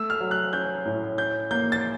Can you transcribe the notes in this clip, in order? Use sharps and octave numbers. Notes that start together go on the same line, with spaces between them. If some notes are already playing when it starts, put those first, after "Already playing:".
Already playing: A3 E6
F6
F#3
F#6
C#4 G6
A2
C#4 G6
A#3 G6
A6